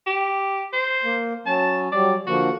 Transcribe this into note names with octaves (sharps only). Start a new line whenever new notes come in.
G4
C5
A#3
F#3 C#4 A5
F#3 G3 D5
D3 F3 A#3 F#4